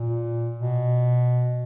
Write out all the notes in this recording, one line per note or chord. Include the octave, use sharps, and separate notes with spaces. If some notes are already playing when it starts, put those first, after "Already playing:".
Already playing: A#2
B2